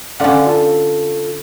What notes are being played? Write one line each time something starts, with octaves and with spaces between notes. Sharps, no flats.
D3 C#4 D5 F5 F#5
F4 A4